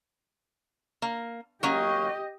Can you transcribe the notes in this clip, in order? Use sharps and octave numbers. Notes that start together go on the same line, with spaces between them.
A#3
F#3 A#3 C#4 G4 D#5